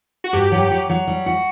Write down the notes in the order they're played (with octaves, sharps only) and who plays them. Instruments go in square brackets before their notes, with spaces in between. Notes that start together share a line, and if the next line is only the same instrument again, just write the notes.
[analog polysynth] F#4
[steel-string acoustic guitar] G2 [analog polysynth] G4
[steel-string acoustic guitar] F#3
F#3
F#3
G3
F#4